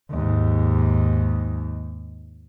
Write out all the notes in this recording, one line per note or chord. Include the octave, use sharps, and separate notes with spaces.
D#2 G#2